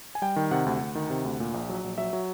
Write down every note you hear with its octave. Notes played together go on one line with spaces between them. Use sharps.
G#5
G3 G5
D#3
C3 F#5
D2
D2
D#3
C3
D2
A#2
A#1
F#3
A#1
F#3 E5
F#3